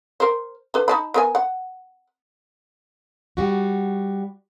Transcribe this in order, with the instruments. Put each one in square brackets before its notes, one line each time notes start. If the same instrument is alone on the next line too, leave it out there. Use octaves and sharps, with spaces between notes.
[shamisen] A#4 C5
D3 B4
D#4 A5 B5
B3 A#4 G#5
F#5
[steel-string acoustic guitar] G3 F#4